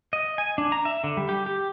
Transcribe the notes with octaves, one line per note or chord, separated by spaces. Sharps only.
D#5
G#5
D4
A#5
E5
D3
G3
G4
G4